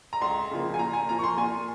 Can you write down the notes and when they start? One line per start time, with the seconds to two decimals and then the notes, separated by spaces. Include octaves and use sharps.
0.13 A#5
0.21 C#2 C6
0.51 C#3 F3 A#3
0.74 G#5
0.79 A#2 A#5
0.93 G#5
1.09 F3 A#3 A#5
1.19 C#6
1.23 C6
1.38 A#2 G#5